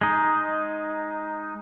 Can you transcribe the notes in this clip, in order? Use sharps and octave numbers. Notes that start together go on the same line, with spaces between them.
G#3 D#4